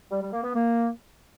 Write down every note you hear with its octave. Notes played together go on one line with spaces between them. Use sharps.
G3
G3
A#3
B3
A#3